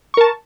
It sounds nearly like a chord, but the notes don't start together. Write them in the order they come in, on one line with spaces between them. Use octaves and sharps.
C#6 A#4 A5